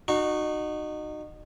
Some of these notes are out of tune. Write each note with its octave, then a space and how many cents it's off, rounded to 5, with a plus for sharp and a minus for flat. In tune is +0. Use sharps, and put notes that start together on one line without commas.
D#4 -30 F#4 -5